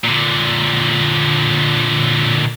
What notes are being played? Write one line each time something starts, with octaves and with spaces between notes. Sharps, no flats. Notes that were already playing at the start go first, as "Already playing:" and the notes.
A#2 D3